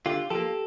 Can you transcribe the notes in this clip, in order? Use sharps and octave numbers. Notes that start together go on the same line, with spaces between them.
D3 F4 G4
F3 A#3 G4 A4